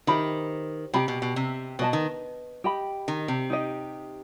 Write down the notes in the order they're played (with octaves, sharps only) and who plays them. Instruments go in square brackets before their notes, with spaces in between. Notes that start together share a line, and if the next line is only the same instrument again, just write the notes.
[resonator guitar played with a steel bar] D#3 [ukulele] G4 C5 E5 B5
[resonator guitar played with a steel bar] C3 [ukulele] G4 D#5 G5 B5
[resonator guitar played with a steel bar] B2
B2
C3
[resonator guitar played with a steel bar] B2 [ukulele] B4 D#5 A5
[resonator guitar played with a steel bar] D#3
[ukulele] G4 D#5 G5 B5
[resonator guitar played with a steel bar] D#3
C3
[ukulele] D#4 G4 D#5